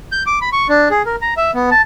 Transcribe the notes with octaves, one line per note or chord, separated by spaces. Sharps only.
G6
D6
B5
C#6
D4
G#4
A#4
A#5
E5
B3
A5